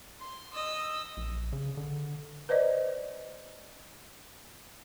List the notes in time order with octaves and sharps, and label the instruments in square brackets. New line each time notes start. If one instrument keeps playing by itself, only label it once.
[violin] C6
D#5 E6
[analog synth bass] A#1
C#3
D3
[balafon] B4 C5 D5 D#5